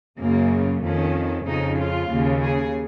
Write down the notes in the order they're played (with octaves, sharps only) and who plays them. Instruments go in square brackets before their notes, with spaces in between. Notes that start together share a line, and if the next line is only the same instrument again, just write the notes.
[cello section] F#2 C#3 A#3
F2 D#3 C#4
F2 C#3 D#4
F4
D#2 C#3
G#4